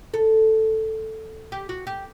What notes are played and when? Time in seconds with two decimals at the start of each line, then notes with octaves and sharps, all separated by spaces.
0.14 A4
1.52 G4
1.69 F#4
1.87 G4